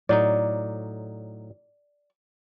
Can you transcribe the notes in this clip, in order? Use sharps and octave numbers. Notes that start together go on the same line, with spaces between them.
A2 F#3 D#4 D5